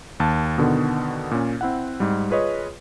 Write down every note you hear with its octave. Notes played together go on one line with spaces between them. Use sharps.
D#2 A5
B2 D3 D#3 B3
A#2 C#4
C4 E4 F#5
G#2 G3
F4 G#4 B4 C#5 D#5